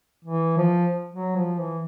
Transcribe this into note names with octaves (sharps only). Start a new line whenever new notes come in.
E3
F3
F#3
F3
E3